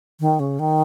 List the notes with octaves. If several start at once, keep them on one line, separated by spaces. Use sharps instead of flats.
D#3
C#3
D#3